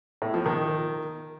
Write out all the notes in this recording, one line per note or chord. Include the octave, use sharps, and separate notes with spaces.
A2
F3
D#3